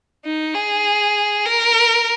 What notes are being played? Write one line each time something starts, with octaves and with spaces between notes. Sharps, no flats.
D#4
G#4
A#4